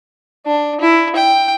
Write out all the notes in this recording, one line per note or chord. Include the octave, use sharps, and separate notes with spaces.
D4
E4
G5